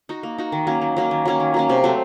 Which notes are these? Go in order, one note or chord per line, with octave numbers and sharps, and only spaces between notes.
D#4 F#4
A#3
D#4 F#4
D#3
F#3 A#3 C#4
D#3
F#3 A#3 C#4
D#3
F#3 A#3 C#4
D#3
F#3 A#3 C#4
C3
F#3 A3 C4